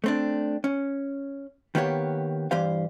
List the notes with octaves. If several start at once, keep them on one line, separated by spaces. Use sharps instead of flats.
A3 C4 D4
C#4
D#3 A#3 B3 G4 C#5
G2 E3 G4 C5 F5